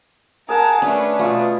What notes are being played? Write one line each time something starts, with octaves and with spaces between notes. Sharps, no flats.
G#4 A#4 F#5 A5
A3 C#4 D4 B4
B2 A3 F4